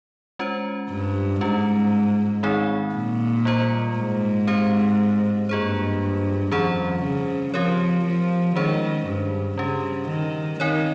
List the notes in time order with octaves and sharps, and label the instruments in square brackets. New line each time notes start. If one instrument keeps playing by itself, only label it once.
[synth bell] G#3 C#4 F4 C5
[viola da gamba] G2
[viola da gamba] G#2 [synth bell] G3 C#4 F4
[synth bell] D#3 G#3 C4 D#4 G#4
[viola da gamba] A#2
[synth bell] G3 A#3 F4 C5
[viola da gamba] G#2
[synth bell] C4 G4 C5
[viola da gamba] G2 [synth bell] A#3 F4 G#4 C5
[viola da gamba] F2 [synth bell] D#3 G3 C#4 G#4 C5
[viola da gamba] C#3
[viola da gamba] F3 [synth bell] C4 G4 A#4 C#5
[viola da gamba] F3
[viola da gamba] D#3 [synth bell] G#3 C#4 G#4 C5
[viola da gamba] G2
[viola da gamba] C#3 [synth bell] G3 C#4 G4
[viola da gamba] D#3
[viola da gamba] D#3 [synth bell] C4 D#4 A#4 C#5